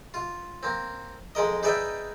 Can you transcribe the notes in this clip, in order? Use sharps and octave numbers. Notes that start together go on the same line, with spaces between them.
F4
A#3 C4
F2 G#3 A#4 D#5
D#4 G#4 B4 D5 E5 G5